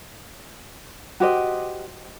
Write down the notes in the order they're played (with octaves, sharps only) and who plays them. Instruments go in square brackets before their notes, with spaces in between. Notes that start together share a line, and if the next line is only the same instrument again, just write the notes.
[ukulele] F#4 G4 C5 D#5